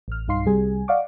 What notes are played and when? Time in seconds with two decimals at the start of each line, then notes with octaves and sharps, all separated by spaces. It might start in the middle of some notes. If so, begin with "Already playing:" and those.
0.08 A1 F6
0.28 B1 G2 D#4 F5 C6 C7
0.45 C2 C3 G3 G#4 G#5
0.88 D5 D#5 F5 F#5 C#6 D6